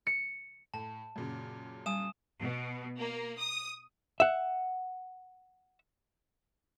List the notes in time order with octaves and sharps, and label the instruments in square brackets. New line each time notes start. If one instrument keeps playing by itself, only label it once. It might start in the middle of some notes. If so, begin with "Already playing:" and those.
[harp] C#7
[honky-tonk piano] A2 [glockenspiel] A5
[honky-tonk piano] F#2 A#2 C#3
[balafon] G3 [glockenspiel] G#5 D#6 E7
[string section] B2
A#3
D#6
[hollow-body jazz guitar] E5 F#5